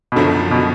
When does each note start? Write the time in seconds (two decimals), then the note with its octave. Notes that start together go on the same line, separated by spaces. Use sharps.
0.12 B2
0.16 F#1 F#2 D3 F3
0.51 B2